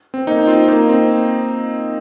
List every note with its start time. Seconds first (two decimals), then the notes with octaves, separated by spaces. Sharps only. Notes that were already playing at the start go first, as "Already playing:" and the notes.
0.14 C4
0.27 A#3 D#4
0.48 C4 F4
0.68 A#3 D#4
0.89 C4